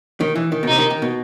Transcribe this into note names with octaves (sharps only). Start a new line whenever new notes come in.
D#3
E3
D#3
B2
C3 D#4
D#3
D#3
B2